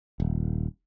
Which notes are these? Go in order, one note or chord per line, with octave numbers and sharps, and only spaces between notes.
D#1